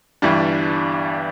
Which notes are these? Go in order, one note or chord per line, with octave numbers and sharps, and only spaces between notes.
G1 G2 E3 G3 D4